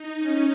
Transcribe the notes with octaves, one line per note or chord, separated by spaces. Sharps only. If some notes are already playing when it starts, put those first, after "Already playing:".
Already playing: D#4
C#4